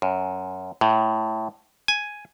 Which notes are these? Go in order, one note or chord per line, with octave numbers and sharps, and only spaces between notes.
F#2
A2
G#5